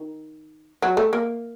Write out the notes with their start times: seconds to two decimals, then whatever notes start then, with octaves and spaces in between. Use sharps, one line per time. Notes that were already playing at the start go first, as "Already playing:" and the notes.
Already playing: D#3
0.82 F#3
0.97 A3
1.13 A#3